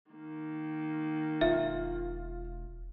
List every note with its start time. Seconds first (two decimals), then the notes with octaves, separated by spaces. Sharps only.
0.11 D#3 A#3
1.41 E1 F4 E5